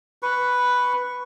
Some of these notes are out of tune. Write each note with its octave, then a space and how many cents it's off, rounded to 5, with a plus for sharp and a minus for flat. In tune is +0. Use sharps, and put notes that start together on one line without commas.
B4 +0 C#6 +0